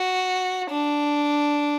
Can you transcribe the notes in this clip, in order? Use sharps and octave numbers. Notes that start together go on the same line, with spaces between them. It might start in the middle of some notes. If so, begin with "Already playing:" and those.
Already playing: F#4
D4